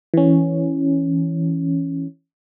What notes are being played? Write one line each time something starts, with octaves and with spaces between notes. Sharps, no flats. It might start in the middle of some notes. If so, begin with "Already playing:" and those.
E3 C#4